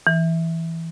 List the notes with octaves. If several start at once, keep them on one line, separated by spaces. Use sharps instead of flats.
E3